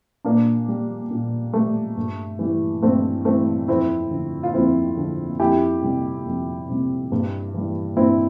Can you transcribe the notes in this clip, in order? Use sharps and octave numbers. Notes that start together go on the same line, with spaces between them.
A#2 A#3 D4
G3
A#2
G3 A3
G2
E3 G3
G2 A3 C4
E3 G3 A3 C4
F2 C4 E4
D3 F3
F4
F2 C4 E4
D3 F3
F2 E4 G4
C3 G3
F2
C3 G3
G2
E3 G3
G2 C4 E4